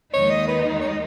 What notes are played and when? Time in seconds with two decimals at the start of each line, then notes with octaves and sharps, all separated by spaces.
0.13 D#2 D#3 G#3 D#4 C#5
0.30 D#5
0.48 B4
0.81 C#5
0.89 D#5